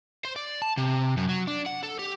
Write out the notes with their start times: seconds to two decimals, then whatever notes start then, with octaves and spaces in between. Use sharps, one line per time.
0.25 C5
0.36 D5
0.62 A5
0.77 C3
1.17 F#2
1.29 F#3
1.47 D4
1.66 F#5
1.83 A4
1.99 G4